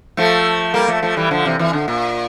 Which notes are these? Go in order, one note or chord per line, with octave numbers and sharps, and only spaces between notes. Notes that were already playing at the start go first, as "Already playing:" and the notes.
F3 A3
G3 A#3
F3 A3
F3 A3
E3 G3
D3 F3
C3 E3
C3 E3
D3
A#2